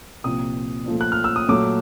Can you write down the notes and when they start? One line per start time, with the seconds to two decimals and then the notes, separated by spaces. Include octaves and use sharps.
0.24 C2 A#2 F3 D#6
0.86 A#2 F3 A3
1.01 F#6
1.12 F6
1.24 E6
1.36 D#6
1.48 A#2 F#3 A3 D6